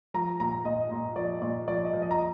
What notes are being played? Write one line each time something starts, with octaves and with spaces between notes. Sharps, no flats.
F3 A#5
A#2 A#5
A#2 D#5
A#2
F3 D5
A#2 D5
F3 D5
D#5
F3
D#5
A#5